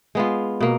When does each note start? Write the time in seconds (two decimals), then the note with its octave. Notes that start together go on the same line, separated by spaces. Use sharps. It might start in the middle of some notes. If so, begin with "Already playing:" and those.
0.15 G#3 B3 F4
0.60 B2 A#3